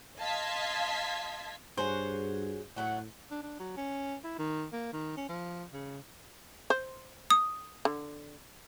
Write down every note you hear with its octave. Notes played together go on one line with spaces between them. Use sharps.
D#5 F5 A5 C6 G#6 B6
G2 F#4 G#4 C5 C#5
A2 F#3 A3 F#4 F#5
D4
D4
F#3
C#4
E4
D#3
A#3
D#3
C#4
F3
C#3
C5
D#6
D3